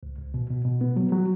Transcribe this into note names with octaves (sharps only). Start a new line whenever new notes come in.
C#2
C#2
B2
B2
B2
B3
F#3
F#3